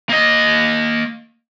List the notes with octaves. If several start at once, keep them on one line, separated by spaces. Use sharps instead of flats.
A#3 D#5